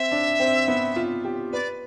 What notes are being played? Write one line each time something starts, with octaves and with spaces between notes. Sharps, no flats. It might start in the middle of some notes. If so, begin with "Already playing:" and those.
Already playing: C4 E5
D4
C4
B3
F4
G4
B4 D5